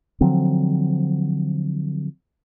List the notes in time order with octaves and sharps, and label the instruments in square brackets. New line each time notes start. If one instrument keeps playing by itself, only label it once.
[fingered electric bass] D3 F3 F#3 C4